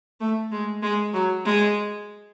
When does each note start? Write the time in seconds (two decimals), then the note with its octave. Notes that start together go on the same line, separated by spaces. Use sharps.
0.20 A3
0.51 G#3
0.82 G#3
1.13 F#3
1.45 G#3